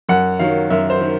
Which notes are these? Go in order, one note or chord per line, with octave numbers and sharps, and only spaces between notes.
F#2 F#5
D#3 F#3 F5
F#2 E5
C5
D#3